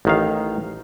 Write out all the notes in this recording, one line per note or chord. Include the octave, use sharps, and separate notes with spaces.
A1 D#3 F5